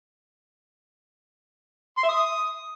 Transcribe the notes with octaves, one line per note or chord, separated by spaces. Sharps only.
C6
E5
D#6